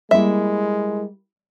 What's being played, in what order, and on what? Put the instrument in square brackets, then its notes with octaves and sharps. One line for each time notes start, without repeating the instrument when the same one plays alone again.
[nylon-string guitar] G3 A#3 E4 [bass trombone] G#3 [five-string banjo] E5